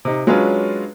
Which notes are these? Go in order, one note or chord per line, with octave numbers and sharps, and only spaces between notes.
C3 D#4
F#3 G#3 C#4 D4 F4 B4